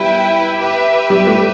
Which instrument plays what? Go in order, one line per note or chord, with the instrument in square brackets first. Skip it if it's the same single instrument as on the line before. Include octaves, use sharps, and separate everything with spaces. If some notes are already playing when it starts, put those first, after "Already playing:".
Already playing: [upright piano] G3 [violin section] E4 B4 E5 G5
[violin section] G4 B4 E5
[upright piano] G3
A3